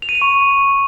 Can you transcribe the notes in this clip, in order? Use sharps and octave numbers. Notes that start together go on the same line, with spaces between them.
F7
D#7
F7
C#6